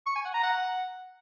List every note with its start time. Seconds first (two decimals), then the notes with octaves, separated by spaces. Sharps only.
0.06 C#6
0.15 G#5
0.25 F#5
0.34 A#5
0.43 F#5